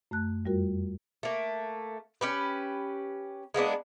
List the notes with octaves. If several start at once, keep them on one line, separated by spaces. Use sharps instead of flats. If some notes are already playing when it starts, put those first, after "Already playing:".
F#2 A3 A5 F#6
F2 G3 F4 F#4 A#4
A3 A#3
C#4 G4 B4
G#3 A#3 B3 D4